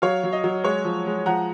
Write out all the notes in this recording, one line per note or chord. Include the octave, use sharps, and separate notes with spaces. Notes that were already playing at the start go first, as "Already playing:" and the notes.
F#3 C#5 F5
F#3
D#5
F#3
G#3 C#5
F3
G#3
F3 F#5 A#5